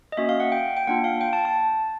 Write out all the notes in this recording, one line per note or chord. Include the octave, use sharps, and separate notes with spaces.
D#5
A#3 C#4 F#4 E5
F5
F#5
G5
G5
A#3 D4 F4 F#5
F5
G5
A5
A5